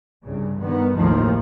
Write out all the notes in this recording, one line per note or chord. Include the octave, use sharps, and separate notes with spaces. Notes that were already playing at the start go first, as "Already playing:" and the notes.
C2 G2 C#3
G2 D#3 B3
G#1 D#2 A2 D#3 F3